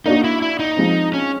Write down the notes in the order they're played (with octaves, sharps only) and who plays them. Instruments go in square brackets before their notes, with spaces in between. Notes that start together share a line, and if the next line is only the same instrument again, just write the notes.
[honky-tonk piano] A#3 D4 F#4 [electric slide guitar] D#4
[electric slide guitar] E4
E4
D#4
[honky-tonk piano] F3 G#3 C4
[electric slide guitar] C#4